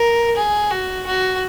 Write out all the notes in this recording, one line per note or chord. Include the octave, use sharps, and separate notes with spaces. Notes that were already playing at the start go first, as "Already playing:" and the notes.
Already playing: A#4
G#4
F#4
F#4